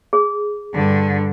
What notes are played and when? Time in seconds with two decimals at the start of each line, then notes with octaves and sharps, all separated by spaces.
0.13 G#4
0.73 G2 D3